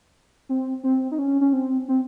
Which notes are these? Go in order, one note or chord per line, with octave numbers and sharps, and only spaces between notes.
C4
C4
D#4
C#4
C#4
C4
C4